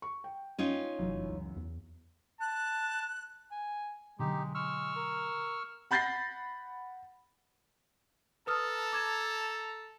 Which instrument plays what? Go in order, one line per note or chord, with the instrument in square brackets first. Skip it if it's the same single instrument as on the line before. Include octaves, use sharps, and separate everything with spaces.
[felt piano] C#6
G5
[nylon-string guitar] C#4 D#4 F4
[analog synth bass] F1 [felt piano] F#2 E3
[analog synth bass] C#2
E2
[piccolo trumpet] A5 [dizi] F#6
[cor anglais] G#5
[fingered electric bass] B2 D3 F#3 [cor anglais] G#3 [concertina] D#4 G4
[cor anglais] G#3 [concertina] C#6 E6 F6
[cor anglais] A#4
[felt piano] F#5 B5 G6 A6 A#6 C7
[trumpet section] A4 A5 A#5 [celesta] B4 D#6 F6
[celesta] D6 G#6 E7